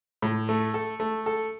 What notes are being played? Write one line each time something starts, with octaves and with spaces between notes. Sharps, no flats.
A2
A3
A4
A3
A4